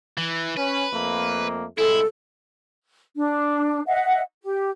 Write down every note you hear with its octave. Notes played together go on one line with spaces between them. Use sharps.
E3
C#4 B4
F2 A3 A#3
C2 G#3 E4 A4
D4
D#5 E5 F#5
G4